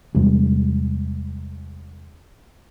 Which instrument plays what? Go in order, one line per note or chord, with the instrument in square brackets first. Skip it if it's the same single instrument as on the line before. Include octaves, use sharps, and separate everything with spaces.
[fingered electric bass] E2 C3 G3 G#3